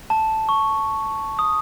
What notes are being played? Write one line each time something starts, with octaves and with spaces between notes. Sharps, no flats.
A5
C#6
D#6